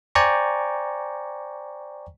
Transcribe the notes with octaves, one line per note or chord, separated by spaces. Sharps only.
C5 D5 G5 G#5 A#5 C#6